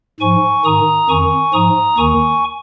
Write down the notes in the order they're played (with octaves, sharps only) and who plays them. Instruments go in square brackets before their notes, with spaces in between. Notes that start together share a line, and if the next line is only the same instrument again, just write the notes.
[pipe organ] G#2 F3 G#5 C#6
G#2 D#3 A#5 D#6
F2 D#3 G#5 C#6
G#2 F3 A#5 D#6
D#2 D#3 G#5 C#6